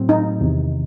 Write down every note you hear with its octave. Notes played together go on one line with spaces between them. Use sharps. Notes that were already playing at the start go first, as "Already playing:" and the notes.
Already playing: A2 F#3 A3 C4
D#4
E2 C3 D#3